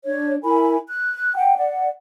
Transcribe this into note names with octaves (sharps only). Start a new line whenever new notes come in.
D4 C#5
E4 A#4 G#5 B5
F#6
F#5 G5
D5 F#5